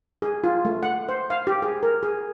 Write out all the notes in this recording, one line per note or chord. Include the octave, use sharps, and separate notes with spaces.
G#4
F4
A3
F#5
C5
F5
G4
G#4
A#4
G#4